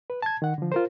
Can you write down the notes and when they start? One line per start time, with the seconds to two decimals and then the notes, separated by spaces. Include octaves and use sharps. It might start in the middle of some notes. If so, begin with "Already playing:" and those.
0.10 B4
0.22 A5 G#6
0.42 D#3 F#5
0.58 D3 F3
0.72 F4 A#4 C5